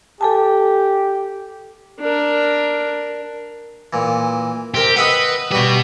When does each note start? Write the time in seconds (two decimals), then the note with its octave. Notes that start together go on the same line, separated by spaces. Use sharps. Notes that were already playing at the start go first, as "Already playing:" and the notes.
0.21 G4 A4 G#5 A5
2.00 D4 A#4
3.93 A#2 E3
4.74 C3 G4 A#4
4.97 B4 D#5 E5 F#5
5.52 B2 G3 F#4 B4